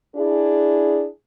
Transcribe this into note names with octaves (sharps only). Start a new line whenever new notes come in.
D4 E4 G#4